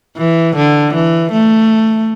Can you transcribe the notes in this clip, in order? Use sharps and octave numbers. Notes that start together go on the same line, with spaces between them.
E3
D3
E3
A3